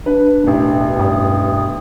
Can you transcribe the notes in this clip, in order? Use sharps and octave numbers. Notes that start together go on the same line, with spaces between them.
D4 B4
E1 A1
G2 D#6